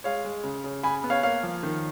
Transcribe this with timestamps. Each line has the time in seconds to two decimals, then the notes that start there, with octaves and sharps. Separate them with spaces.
0.04 G#3 C#5 F5
0.24 G#3
0.44 C#3
0.64 C#3
0.83 C#3 G#5 B5
1.04 B3
1.10 C#5 F5
1.23 A#3 C#5 F5
1.43 F3
1.63 D#3